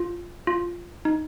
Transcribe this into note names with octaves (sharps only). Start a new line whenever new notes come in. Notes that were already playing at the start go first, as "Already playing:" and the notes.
Already playing: F4
F4
D#4